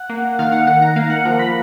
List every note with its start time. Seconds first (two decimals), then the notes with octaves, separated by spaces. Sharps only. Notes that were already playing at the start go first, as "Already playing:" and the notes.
Already playing: F#5
0.09 A#3
0.39 D#3 F5
0.52 F#5
0.67 D#3 F#5
0.82 A#5
0.96 A#3 F5
1.10 F#5
1.25 F3 A#5
1.39 B5